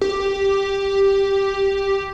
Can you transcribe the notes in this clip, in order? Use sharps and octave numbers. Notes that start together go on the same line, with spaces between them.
G4